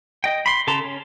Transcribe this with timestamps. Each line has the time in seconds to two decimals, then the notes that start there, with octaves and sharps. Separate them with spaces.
0.24 D#5 G5
0.46 B5 C6
0.67 C#3 A4 A5 A#5 C6
0.84 C#4